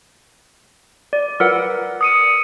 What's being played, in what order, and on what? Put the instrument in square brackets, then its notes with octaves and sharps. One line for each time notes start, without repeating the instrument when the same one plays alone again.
[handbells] D5
[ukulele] A#4 B4 F#5 [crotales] E6
[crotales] D#6 C#7 D#7